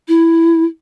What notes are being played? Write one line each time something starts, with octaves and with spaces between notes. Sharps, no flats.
E4